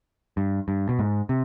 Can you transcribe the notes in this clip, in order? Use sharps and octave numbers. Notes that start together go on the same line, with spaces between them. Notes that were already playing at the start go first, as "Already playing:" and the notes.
G2
G2
B2
G#2
C3